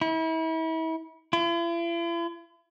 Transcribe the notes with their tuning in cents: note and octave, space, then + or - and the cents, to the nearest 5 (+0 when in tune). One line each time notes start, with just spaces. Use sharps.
E4 -35
E4 +45